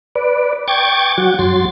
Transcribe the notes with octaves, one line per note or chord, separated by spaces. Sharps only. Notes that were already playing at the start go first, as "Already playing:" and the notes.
B4 D5
G5 C#6 D6 G#6 A6
F#3 F#4
F#2 F#3 C6 A6